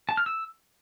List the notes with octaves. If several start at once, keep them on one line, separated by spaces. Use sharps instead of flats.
A5
F6
E6